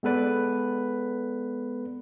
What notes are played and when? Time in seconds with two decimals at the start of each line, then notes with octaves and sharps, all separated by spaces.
0.03 G#3 B3 A4 B4 D5